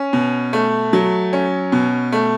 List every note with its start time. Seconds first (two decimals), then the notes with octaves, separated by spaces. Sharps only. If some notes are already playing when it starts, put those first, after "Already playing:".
Already playing: C#4
0.13 B2
0.53 A3
0.93 F#3
1.33 C#4
1.72 B2
2.12 A3